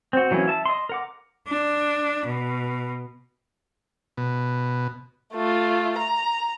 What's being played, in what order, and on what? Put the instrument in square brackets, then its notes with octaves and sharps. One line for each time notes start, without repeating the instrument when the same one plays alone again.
[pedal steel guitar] C4 F#4
E3 F#3 A#3 C#4 E4
E5 A5
D#5 C6
A#4 F#5 D6
[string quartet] D4
B2
[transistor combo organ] B2
[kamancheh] A3 F4
A#5